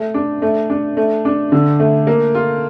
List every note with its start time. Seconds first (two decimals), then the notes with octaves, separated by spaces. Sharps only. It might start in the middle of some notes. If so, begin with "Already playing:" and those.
Already playing: A3
0.14 D4
0.42 A3
0.70 D4
0.97 A3
1.25 D4
1.52 D3
1.80 A3
2.07 A#3
2.35 F4